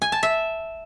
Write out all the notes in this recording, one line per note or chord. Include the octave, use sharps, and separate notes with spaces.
G#5
A5
E5